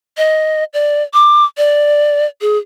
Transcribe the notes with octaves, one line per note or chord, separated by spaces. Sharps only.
D#5
D5
D6
D5
G#4